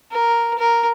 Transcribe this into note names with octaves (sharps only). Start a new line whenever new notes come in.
A#4
A#4